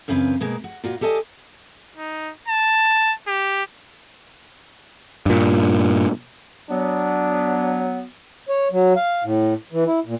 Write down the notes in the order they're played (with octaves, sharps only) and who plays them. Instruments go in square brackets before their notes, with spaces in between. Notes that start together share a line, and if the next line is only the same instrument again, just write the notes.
[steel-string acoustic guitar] F#2 C#3 E3 C4 B4 F5
B2 G#3 A#3
F#4
A#2 F4 F#4
G4 A4 D5 D#5 G#5
[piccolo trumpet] D#4
A5
G4
[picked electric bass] G2 A#2
[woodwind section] F#3 B3 [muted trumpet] D4
[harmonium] C#5
F#3
F5
A2
E3
E4
A#2